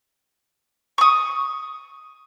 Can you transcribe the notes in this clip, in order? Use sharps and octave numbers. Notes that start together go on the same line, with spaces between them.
C#6 D#6